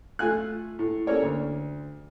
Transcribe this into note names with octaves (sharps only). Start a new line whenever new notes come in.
A3 F4 G#5 F#6
A2
A#3 C#4 A4 A#4 C#5 D5
D2